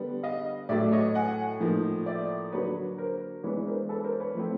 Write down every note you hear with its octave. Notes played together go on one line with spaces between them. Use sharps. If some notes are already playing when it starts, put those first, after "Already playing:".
Already playing: D3 G3 B3
D#5 F5
A2 F#3 A3 D5 E5
C#5 D#5
F#5 G#5
A2 F3 A#3 D#4
D5 E5
D3 F#3 A#3 D4 B4 C#5
A#4 C5
E3 G#3 B3 D4 B4 C#5
A#4 C5
A4 B4
A#4 C5
B4 C#5
F3 A3 C4